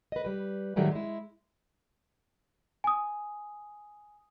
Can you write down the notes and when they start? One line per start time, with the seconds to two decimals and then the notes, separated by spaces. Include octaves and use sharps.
0.12 B4 D#5
0.25 G3 B4
0.76 A2 D#3 F#3 G3 A3 G#4
0.91 G#3 E4
2.84 G#5 D#6